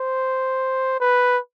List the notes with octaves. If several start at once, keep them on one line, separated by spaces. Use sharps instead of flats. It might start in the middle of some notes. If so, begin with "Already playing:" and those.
Already playing: C5
B4